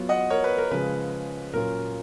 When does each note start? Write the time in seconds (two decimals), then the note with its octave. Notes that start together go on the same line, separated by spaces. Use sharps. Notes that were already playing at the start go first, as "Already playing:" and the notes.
Already playing: F#3 B3 F4
0.09 D#5 F#5
0.30 A#4 C#5
0.44 B4
0.58 A#4
0.71 C#3 F3 G#3 B4
1.53 A#2 F#3 C#4 F4 A#4